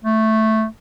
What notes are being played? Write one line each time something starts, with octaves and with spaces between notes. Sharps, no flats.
A3